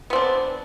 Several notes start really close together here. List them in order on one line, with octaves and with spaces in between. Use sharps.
B3 C4 D4